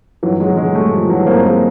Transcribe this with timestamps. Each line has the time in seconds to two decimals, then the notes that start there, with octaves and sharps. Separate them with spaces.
0.23 G2 E3 F#3
0.40 F#3 G#3
0.49 D3
0.57 F#3 G#3
0.75 G2 G3 A3
0.92 F3
1.01 D3
1.09 E3 F#3
1.26 G2 A#3 C4
1.44 G#3 A#3